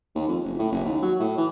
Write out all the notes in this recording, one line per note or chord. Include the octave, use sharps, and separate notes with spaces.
D#2
F2
F#1
A2
F#1
D#2
F#3
A2
E3